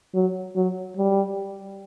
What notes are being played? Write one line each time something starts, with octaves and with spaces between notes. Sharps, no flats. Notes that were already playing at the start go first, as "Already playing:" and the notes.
F#3
F#3
G3